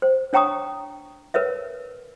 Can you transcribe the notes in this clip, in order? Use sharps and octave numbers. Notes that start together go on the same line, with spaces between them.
C5
D4 C#5 G5 A#5 C#6 D#6
A#4 B4 C#5 E5